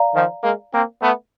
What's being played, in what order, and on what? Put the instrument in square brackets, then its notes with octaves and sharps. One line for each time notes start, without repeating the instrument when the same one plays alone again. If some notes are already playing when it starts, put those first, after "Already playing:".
Already playing: [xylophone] D5 F5 A#5
[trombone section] D#3 F3
G#3 A#3
A#3 C4
A3 B3